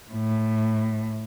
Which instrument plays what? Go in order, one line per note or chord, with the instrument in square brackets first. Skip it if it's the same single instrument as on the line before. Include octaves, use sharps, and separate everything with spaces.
[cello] A2